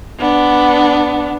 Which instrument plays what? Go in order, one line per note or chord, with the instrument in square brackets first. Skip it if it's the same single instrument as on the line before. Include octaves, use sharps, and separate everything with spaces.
[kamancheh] B3 D4